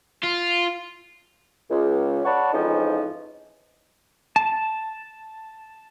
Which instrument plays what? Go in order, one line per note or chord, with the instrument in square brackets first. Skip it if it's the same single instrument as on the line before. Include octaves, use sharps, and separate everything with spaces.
[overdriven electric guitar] F4
[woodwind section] C#2
C#5 D5 F#5 A5 B5 C#6
F2 G#2 E3 F3 C#4 D#4
[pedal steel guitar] A5